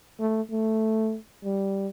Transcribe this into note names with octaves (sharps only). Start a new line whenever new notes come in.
A3
A3
G3